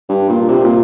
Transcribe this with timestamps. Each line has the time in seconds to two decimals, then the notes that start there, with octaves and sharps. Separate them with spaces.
0.09 G2
0.29 A#2
0.49 C3
0.64 A#2